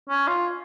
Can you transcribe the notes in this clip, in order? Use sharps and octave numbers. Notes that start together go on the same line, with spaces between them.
C#4
F4